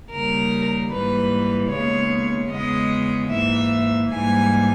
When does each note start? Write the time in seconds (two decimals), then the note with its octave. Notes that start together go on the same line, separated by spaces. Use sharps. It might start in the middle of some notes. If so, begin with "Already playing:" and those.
0.11 D#2 C#3 G3 A#4
0.91 G#2 E3 G3 A#3 B4
1.70 D#2 C#3 G#3 B3 C#5
2.50 E2 C#3 G#3 B3 D#5
3.30 G#2 E3 A#3 E5
4.10 G#2 E3 G3 A#3 G#5